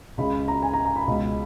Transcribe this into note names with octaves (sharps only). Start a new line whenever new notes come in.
C#2 C#3 G#3 B5
A#5
G#5
A#5
A#5
B5
C#2 B2 G#3